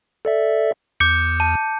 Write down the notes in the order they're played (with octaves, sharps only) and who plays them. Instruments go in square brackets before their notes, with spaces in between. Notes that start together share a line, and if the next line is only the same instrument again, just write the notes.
[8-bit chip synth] A4 D5 E5
[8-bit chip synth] E2 [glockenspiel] D6 G6 C#7
[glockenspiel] A5